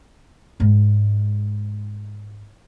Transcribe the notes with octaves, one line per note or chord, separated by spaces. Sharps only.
G#2 G#3